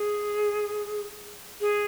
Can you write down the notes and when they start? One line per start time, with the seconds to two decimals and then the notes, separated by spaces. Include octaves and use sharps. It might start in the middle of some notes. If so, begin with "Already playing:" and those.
Already playing: G#4
1.61 G#4